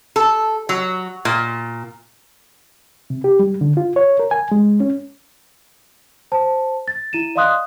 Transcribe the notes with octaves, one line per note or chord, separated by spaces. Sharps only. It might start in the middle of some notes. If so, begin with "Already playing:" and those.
A4
F#3
A#2
C3
G4
G3
D3
F4
C#5
A#4
G#5
G#3
C#4
C5 A5
A6
E4 D#7 E7
D5 D#5 F5 C6 D#6 F#6